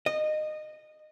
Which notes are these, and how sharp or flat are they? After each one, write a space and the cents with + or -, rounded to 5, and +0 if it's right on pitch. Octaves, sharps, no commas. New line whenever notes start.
D#5 -20